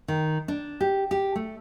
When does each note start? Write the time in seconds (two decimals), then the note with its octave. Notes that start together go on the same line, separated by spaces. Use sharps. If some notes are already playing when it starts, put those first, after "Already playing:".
0.08 D#3
0.48 D4
0.81 G4
1.11 G4
1.36 A3